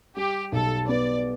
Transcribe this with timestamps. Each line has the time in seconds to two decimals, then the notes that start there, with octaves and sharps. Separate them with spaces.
0.16 G3 G4
0.52 B1 A4
0.89 B3 D5